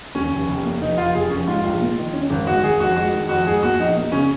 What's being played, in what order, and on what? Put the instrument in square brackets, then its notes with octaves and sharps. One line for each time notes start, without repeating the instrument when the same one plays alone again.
[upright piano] D#2 [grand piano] C#4
[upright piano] F1
F1
A#3
[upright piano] F1 [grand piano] D#4
[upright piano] F1 [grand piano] F4
[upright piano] F1 [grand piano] G#4
[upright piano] F1 [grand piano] C#4
[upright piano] G#2 [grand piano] F4
[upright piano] A#1
A#3
D#3
C#4
G#1
[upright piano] G#2 [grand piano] F#4
[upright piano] G#1 [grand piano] G#4
[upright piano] F2 [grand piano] F#4
[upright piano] G#3 [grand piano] F#4
[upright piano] D#3
[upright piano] F2 [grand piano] F#4
[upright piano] G#2 [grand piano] G#4
[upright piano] A#3 [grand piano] F#4
[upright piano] A#1 [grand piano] D#4
[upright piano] A#3
[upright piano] C#3 [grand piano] C#4